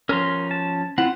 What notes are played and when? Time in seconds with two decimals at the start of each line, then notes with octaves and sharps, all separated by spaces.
0.09 F3 C#4 A#4 A#5 C6
0.51 A5
0.98 C4 E4 F4 F#5